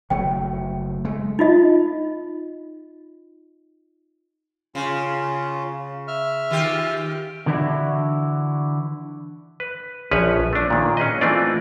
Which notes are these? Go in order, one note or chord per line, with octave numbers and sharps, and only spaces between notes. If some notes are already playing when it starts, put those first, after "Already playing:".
F#1 F#3 A3 G5
G#3 A3
D#4 F4 D#5
C#3 C#4 F4
E5 F6
D#3 F4 G4
D3 E3 D4 E4 F#4
B4
A#1 F3 C#4 B4 C#5 G#5
A3 D4
A#2 D#3
C#4 G#4 B4 D#5
E3 A3 C4 D4 F4 D5